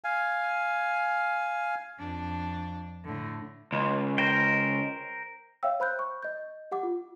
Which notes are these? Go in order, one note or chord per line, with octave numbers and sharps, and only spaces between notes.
F5 G#5
F2 D4
A2 D3
C#2
A#4 C5 G5
C#5 E5 F5 G5 E6
C5 B5 F#6 G6
C#6
D#5 G6
G4 F#5 D6
F4